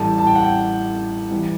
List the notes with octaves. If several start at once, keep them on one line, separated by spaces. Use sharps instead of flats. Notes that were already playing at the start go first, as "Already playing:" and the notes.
Already playing: A1 A2 G3 A5
A5
G5
F#5
G5
E3 G3